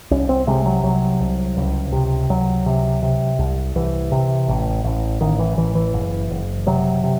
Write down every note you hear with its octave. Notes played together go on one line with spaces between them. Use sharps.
C2 C#4
C4
C3 G#3
F#3
C2 F#3
C2
C#2
C3
C#2 F#3
C3
C3
C2
C2 E3
C3
A1
A1
A1 D#3
E3
A1 E3
E3
F#1
F#1
C3 F#3
C3